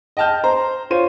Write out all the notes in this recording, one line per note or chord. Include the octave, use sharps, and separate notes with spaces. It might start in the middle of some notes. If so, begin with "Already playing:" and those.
D#5 G5 A5 F6 G6
C5 A#5
F4 C5 C#5 D#7